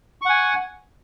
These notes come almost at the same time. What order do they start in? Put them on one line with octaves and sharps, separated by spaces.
C#6 F#5 G#5